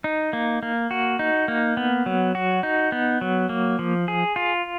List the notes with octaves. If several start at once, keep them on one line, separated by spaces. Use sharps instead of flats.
D#4
A#3
A#3
F#4
D#4
A#3
B3
F#3
F#4
D#4
B3
F#3
A#3
F3
G#4
F4